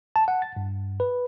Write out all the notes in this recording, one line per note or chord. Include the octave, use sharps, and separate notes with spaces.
A5
F#5
A6
G2
B4